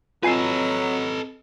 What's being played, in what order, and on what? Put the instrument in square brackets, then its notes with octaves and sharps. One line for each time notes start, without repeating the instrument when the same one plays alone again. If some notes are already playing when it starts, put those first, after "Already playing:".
[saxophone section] F#3 [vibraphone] C4 D#5 [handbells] F4 G#5 C7 [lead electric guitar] A4 B4